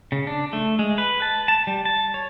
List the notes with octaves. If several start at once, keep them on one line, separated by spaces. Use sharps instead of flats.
C#3
D4
A3
G#3
B4
A5
A5
G3
A5
C#5